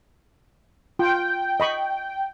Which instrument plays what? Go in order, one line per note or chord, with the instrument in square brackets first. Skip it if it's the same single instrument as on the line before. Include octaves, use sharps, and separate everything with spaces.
[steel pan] F4 [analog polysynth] G5
[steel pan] D#5 B5 C#6